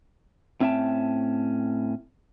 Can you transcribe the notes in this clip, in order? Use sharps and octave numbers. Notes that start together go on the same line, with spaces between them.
A2 C4 C#4 E5 G5 A5